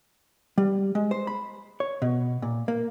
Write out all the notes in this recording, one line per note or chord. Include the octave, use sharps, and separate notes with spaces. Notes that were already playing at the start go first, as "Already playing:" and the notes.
G3
G#3
C5
B5
C#5
B2
A#2
A#3